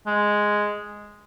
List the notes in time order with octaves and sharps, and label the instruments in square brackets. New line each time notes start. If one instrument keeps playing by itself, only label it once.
[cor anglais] G#3